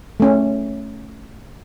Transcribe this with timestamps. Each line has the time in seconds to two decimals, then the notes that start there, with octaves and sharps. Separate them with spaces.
0.20 A3 C#4